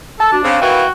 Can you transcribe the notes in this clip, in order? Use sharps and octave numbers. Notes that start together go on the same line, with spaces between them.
A4 A5
D4 F#4
C#3 C4 F5
B2 D#3 E3 F#4 G5